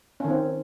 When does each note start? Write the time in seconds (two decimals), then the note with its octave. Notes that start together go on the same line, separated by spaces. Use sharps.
0.20 C#4
0.24 D#3
0.29 C4